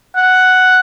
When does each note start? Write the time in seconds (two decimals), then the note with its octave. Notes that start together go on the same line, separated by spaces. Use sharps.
0.15 F#5